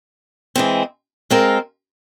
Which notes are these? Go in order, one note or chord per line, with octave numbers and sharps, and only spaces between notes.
E3 G#3 C4
G#3 C4 F4 A#4